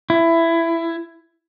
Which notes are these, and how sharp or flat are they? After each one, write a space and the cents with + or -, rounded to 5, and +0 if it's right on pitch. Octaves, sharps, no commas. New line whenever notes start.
E4 +15